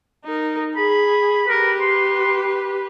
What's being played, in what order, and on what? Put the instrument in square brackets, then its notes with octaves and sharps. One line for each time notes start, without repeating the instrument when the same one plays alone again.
[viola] D#4 A#4
[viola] G#4 [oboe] B5
[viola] G4 B4 [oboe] A#4
[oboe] C6